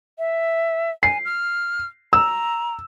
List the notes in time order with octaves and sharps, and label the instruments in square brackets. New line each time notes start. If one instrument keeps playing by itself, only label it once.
[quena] E5
[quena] G#5 [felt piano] C7
[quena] F6
[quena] A#5 [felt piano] E6